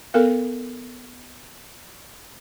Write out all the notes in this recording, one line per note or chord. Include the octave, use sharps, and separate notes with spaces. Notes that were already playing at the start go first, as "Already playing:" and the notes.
B3 A4 A#4 F5